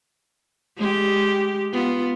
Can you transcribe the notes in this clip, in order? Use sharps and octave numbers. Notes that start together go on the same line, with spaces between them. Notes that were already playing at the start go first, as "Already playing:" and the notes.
G#3 G4
B3 F4